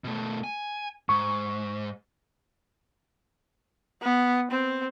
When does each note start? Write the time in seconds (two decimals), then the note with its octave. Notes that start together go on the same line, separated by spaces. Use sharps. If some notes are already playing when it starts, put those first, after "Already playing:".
0.04 B2 A3
0.44 G#5
1.09 G#2 C#6
4.02 B3
4.51 C4